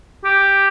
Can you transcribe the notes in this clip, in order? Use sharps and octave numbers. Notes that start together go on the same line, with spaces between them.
G4